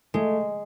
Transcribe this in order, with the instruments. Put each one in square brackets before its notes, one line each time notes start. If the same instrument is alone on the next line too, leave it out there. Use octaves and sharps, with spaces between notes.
[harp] G#3 [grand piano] A3